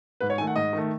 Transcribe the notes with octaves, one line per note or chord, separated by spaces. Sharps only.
G#2 B4
C#5
D#3 A3 G#5
F#5
G#2 D#5
D#3 A3